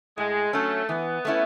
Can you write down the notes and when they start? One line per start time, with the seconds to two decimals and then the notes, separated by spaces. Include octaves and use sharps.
0.18 A2 G#3
0.53 F#3 A3 C#4
0.89 E3 B3
1.25 A3 C#4 E4